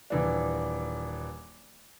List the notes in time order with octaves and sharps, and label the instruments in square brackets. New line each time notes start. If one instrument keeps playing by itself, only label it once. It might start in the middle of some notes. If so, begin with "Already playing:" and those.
[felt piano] D#1 E3 D4